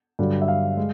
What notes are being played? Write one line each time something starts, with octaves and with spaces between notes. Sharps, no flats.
G2 D3 F#3
E5
F5
G#3